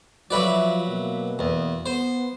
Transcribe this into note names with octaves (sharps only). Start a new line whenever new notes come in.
F3 F#3 F#4 B4 D5 E5 F5
B2 A#3
E2 D#6
B3 C5